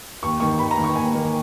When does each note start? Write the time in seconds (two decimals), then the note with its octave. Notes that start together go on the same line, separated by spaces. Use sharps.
0.23 D#2 C#6
0.40 D#3 A#3 C#6
0.59 D#2 B5
0.71 A#5
0.78 D#3 A#3
0.84 C#6
0.96 D#2 G#5
1.14 D#3 A#3